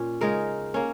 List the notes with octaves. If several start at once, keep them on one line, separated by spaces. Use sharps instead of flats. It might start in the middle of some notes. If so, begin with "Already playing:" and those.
Already playing: A#2 C#4
C#3 G#3 D#4 A#4
A#3 C#4